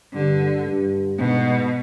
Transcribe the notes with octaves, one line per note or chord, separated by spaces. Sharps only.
G2 D3
G2
G#2 B2